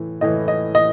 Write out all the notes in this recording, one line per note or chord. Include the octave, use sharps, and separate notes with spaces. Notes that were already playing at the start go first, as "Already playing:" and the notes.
Already playing: A2 E3
A2 E3 D#5
D#5
D#5